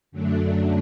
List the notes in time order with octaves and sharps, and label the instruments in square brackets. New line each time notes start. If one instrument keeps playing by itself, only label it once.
[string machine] F#2 D3 F#3 A3 D4